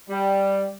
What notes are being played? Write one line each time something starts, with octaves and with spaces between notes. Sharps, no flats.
G3